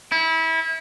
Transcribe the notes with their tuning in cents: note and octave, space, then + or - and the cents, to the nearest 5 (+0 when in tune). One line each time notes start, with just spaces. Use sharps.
E4 -25